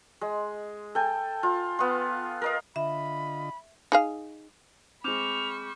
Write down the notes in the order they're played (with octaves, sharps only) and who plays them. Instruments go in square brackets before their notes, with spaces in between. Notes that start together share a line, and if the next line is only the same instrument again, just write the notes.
[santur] G#3
A4 G5 G#5
F4
B3 F4
A#4 D#5 F5
[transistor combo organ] D3 F4 D#5 [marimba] E5 [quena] B5
[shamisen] D#4 G#4 F5
[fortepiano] G#3 C4 [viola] B5 C#6 [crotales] D6 F6 G6 [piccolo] F7